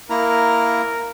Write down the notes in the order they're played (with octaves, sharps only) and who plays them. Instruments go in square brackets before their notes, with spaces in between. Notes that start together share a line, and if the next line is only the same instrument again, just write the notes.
[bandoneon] A#3 E4 A#5 [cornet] A#4